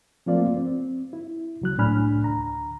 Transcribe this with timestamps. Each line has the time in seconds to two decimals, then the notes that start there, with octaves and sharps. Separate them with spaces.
0.26 F3 A3 A#3 C4 F4 D5
0.57 C4
1.13 E4
1.61 C#2 F#3 F#6
1.78 C2 A2 D4 G#5 B5 F6
2.23 D2 A#5